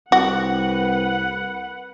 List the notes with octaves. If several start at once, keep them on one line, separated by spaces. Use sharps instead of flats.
C2 F#4 B4 F#5